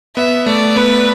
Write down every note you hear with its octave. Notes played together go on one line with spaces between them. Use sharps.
B3 E5
A3 D5
B3 B4